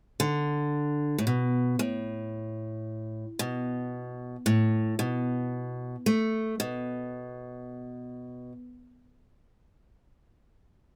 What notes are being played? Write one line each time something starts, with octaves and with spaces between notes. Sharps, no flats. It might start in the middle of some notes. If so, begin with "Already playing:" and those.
D3
A2
B2
A2
B2
A2
B2
A3
B2